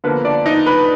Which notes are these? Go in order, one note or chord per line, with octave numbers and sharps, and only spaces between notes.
D3 F3 A#3 B3 B4
D4 D5
D#4 D#5
B4 B5